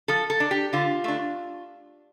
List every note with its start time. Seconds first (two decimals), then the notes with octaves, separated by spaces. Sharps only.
0.08 F3 A4
0.30 A4
0.40 D4
0.51 G4
0.73 D3 F4
1.04 A3 D4